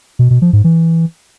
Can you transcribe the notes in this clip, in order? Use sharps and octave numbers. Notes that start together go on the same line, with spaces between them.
B2
B2
F3
G#2
E3